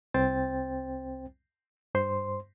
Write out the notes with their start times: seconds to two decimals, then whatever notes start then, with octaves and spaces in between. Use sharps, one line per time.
0.14 C2 C4 C5 G5 A6
1.95 G2 C5 C6